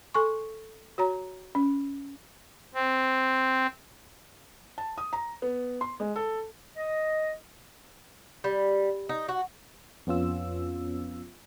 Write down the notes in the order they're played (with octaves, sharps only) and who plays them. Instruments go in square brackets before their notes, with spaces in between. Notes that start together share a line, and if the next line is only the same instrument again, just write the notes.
[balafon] A4 G#5 C6 C#6
F#4 C#5 A#5
C#4
[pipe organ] C4
[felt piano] A5
D#6
A#5
B3
C6
G#3
A4
[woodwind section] D#5
[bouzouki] G3
D#4
F#4
[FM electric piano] F2 B3 C#4 F4 E6